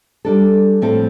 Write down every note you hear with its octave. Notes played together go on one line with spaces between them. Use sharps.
G3 D4 A4
A2 F3 C4 A4